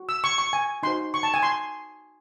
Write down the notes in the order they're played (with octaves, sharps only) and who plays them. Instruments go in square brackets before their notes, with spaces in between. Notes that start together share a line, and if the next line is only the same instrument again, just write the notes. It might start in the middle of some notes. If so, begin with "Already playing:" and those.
Already playing: [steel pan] F#4
E6
C#6
C#6
G#5
D#4 F#4 C5 C6
C#6
A5
G#5
C6